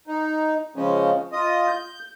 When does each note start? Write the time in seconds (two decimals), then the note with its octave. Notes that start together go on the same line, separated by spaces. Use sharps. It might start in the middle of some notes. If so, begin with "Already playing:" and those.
0.07 D#4
0.76 C#3 F3 G#3 C#4
1.32 F4 D#5 D#6
1.67 G6